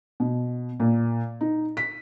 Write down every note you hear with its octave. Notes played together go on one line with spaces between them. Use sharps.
B2
A#2
D#4
B6